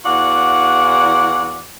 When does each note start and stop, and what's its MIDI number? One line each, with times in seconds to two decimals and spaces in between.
0.05 1.64 40
0.05 1.64 52
0.05 1.64 66
0.05 1.64 74
0.05 1.64 77
0.05 1.64 78